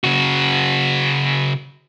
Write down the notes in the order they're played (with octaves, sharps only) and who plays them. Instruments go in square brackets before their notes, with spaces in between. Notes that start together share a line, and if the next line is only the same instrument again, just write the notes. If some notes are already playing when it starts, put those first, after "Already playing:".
[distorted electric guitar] C#3 F#4